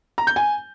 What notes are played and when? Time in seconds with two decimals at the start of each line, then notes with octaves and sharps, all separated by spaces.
0.18 A#5
0.27 G6
0.36 G#5